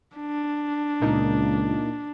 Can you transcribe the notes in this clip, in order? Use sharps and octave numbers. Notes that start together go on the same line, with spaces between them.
D4
C#2 A#2 A#3 D#4